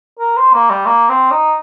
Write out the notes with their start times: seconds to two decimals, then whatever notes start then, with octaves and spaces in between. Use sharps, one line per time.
0.20 A#4
0.37 C5
0.54 A#3
0.70 G3
0.86 A#3
1.10 C4
1.32 D#4